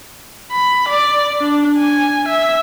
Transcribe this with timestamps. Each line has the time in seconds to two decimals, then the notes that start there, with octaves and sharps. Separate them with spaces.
0.51 B5
0.89 D5
1.40 D4
1.78 G#5
2.28 E5